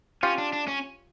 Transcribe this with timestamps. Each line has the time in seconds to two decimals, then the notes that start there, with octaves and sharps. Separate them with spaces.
0.23 C#4 F4 G4
0.38 D4
0.53 D4
0.67 C#4